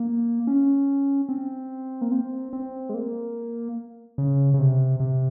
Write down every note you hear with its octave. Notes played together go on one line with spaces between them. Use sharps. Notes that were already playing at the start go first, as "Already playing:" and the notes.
Already playing: A#3
C#4
C4
A#3
C4
C4
G#3
A#3
C#3
C#3
C3
C3